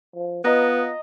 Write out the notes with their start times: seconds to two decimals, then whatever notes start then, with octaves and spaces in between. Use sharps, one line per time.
0.15 F3
0.45 B3 F4 B4 D#5 A#5